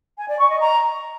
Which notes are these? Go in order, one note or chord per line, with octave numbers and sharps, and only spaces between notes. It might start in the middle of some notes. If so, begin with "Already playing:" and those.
G#5
D5
C#6
D#5
A#5